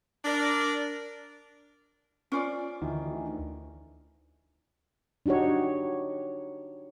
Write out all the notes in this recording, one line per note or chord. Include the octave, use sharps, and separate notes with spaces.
D4 A#4
C#4 F4 C5 D5 G#5
D2 D#3 E3
D4 D#4 F#4 G4 C#5